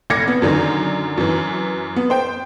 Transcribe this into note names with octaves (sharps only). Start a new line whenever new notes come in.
F1 D6 G#6 A#6 C#7
B3
F#2 D3 D#3
F#2 E3
B3
C5 G5